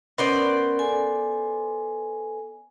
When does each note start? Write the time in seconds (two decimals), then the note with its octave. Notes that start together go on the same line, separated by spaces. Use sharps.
0.18 B3 C#4 A#4 C5 D5
0.79 A4 G#5